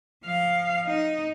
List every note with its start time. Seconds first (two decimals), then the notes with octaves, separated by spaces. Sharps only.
0.24 F3 F5
0.86 D#4